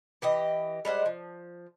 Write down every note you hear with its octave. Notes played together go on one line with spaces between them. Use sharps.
E3 G4 D#5
G3 G#3 C5 F#5
F3